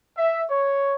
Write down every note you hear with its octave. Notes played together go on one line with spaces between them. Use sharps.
E5
C#5